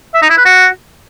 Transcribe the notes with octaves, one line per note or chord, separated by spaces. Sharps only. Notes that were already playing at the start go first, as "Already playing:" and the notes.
E5
D#4
E4
B4
F#4